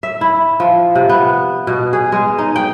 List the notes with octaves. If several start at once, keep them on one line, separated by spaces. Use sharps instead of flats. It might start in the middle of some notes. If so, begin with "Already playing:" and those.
E5
E4
F3
C3
B3
B2
G#4
G#3
D#4
G5